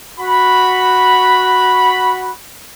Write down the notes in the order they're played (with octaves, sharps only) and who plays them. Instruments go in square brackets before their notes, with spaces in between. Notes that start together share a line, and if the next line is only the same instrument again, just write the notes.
[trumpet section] F#4 B5